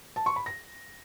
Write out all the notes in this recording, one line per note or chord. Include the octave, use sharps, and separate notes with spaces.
A5
C#6
B5
A#6